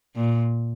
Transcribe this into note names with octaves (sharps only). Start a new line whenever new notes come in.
A#2